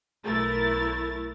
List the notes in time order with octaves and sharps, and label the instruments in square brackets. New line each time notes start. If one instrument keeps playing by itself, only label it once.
[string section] B1 A3 E4 A#4 A6